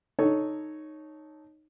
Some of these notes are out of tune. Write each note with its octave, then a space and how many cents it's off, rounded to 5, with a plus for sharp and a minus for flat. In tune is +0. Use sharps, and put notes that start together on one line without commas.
D#4 -10 A4 -10 C#5 +0